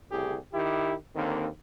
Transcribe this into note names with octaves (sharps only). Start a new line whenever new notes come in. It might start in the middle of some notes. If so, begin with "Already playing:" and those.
C2 A2 C#3 G4 G#4
D#3 E4 G4
D#2 D3 D#3 A#3 C4